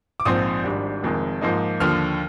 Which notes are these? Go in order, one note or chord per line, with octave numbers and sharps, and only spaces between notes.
D6
A#1 G#2 F3 C4 D#6
G#1 G#2 G3 D4
F1 F2 D#3 G#3
G#2 F3 A#3 D#4
D#2 D3 F3 F6